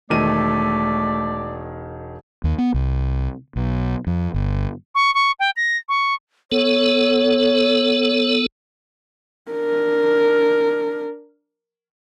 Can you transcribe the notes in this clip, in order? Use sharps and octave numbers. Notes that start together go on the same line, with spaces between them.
E1 D#3 A3 D5 D#7
D#2
B3
C2
B1
F2
G1
C#6
C#6
G5
A#6
C#6
B3 A4 C#5
D4 A#4